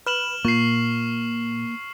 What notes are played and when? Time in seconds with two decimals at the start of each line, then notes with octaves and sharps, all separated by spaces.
0.06 B4 F6 E7 F#7
0.45 A#2 A#3 C#6 C7